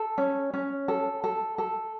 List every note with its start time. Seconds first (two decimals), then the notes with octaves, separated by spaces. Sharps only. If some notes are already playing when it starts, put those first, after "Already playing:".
Already playing: A4
0.18 C#4
0.54 C#4
0.88 A4
1.24 A4
1.58 A4